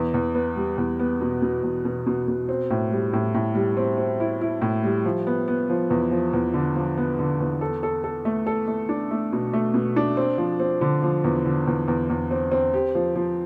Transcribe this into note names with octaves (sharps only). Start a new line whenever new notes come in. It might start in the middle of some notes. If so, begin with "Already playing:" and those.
Already playing: E2
E2
B3
G3
E2
B3
B2
B2
E2
B2
B2
B2
C4
A2
G3
A2
A2
G3
C4
C4
E4
E4
A2
G3
F3
B3
B3
F3
E2
F3
E2
D3
F3
B3
D3
E2
A4
A4
A4
A3
A4
A3
D4
A3
B2
A3
B2
D4
C4
F3
C4
D3
F3
E2
D3
E2
E2
E2
C4
C4
G4
F3
F3